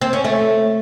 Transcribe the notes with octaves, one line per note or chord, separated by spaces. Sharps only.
C4
C#4
A3